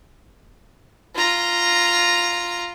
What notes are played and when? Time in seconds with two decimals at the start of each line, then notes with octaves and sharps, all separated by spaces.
1.15 F4 A#5